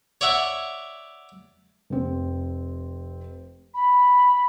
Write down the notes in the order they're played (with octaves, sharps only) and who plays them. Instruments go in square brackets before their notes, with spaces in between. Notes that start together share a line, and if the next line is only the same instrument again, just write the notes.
[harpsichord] C#5 D5 E5 F#5
[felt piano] F1 C4
[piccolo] B5